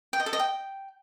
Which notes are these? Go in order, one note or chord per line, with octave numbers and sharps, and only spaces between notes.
G5
D#5
A4
D#5
G5